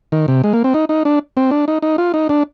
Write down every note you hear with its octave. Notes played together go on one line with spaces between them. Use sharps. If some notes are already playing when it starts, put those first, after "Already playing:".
D#3
C3
G#3
A#3
C4
D#4
D#4
D4
C4
D4
D#4
D#4
F4
D#4
D4